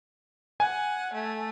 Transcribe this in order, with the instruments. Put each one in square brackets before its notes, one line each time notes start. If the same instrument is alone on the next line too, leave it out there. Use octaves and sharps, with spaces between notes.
[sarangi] F#5 [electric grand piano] G#5
[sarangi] A3